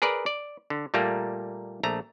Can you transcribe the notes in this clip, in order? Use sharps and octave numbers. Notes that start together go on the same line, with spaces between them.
G#4 A#4 B4 D5
D5
D3
A#2 G3 A3 A#3
A#1 A3 A#5